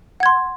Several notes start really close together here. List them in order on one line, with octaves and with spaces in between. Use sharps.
F#5 G#6 C6